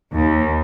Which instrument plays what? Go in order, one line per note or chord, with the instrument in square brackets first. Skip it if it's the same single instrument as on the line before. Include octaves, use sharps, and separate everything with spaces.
[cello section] D#2